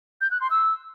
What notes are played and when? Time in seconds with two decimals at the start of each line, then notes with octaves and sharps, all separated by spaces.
0.21 G6
0.31 F#6
0.41 C6
0.51 E6